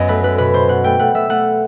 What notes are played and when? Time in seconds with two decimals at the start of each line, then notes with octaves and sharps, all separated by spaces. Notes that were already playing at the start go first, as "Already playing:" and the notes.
Already playing: F#2 F#3 B3 D#5
0.08 A3 B4
0.23 A3 B4
0.38 B2 B4
0.53 B2 C5
0.69 B2 F#5
0.84 A3 G5
0.99 A3 F#5
1.14 A3 E5
1.29 A3 F#5